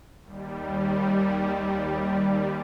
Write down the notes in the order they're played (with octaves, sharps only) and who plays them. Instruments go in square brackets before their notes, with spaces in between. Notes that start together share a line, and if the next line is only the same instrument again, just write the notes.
[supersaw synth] D#2 G3